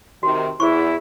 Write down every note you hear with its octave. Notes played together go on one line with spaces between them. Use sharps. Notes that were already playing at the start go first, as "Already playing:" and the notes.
C3 D#3 F#4
E2 E4 G#4 C5 C#6